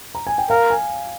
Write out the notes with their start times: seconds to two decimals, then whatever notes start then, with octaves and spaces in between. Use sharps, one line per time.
0.15 A#5
0.27 G#5
0.38 G5
0.50 A#4 F5
0.70 G#5